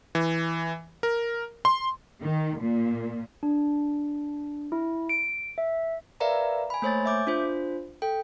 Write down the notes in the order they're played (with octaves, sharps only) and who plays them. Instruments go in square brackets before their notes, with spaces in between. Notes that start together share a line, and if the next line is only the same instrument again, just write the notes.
[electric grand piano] E3
A#4
C6
[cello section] D#3
A#2
[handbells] D4
E4
D7
E5
[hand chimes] A#4 B4 D5 E5 F5 A#5
G#5 B5
A3 A#3 C5 C#5 G#5 A6
E5 D6 G6
D4 F4 C5
A4 G5